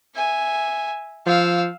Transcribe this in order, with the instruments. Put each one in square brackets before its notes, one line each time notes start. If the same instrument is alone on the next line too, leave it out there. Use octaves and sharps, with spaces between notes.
[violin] E5 G#5
[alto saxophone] F3 [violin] F5 E6